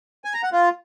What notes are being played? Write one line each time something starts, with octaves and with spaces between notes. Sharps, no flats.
G#5
A#5
F#5
F4